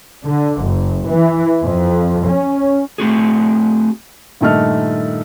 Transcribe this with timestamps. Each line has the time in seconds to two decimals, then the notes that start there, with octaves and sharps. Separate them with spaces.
0.23 D3
0.62 F#1
1.07 E3
1.63 F2
2.28 C#4
2.98 A3 C4 F#4 G#4
4.41 G2 A#2 D#3 A3 D#5 F6